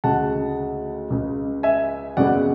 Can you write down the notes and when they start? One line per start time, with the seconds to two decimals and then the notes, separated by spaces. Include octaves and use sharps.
0.04 D2 C#3 G#3 F#5 A5
1.10 C#2 C#3 G#3
1.63 E5 G#5
2.17 F#2 C#3 G#3 B3 D5 F#5